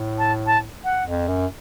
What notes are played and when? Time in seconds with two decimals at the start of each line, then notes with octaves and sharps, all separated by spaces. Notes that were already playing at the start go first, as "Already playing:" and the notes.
Already playing: A2
0.18 A5
0.46 A5
0.84 F#5
1.06 F2
1.28 F#2